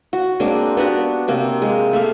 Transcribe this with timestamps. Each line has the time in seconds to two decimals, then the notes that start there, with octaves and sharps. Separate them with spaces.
0.13 F#4
0.40 G#3 A#3 C4 D4
0.77 B3 D4 F#4 G4
1.28 C3 A#3 C4
1.62 G#3
1.93 A3 A#3 E5 F5